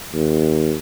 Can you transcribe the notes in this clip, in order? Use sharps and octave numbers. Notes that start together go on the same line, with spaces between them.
D#2